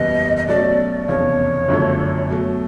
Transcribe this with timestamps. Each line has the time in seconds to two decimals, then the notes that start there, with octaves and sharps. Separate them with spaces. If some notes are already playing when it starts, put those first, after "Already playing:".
Already playing: F#1 E2 B2 G3 B3 D#5
0.36 D#5
0.47 B2 F#3 A3 C#4 D5
1.07 F1 E2 C#3 C#5
1.68 G1 F#2 D3 F3 A3
2.29 B2 F#3 A3